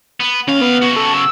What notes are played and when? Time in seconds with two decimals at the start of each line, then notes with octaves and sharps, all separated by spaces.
0.20 B3
0.48 D#2 C#4 F5
0.61 B3
0.82 C#3 F#4
0.96 A4
1.14 E6